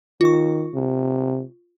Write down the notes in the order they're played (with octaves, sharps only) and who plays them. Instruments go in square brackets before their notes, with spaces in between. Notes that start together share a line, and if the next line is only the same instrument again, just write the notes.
[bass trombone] D#3 [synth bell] F4 C#6
[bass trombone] C3